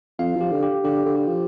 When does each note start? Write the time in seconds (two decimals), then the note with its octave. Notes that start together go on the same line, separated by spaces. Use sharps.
0.19 F2 F5
0.36 F3
0.41 G4
0.51 D3
0.63 G4
0.84 D3 G4
1.06 D3
1.16 G4
1.27 F3